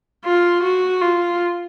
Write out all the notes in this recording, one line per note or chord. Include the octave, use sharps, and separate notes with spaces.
F4
F#4
F4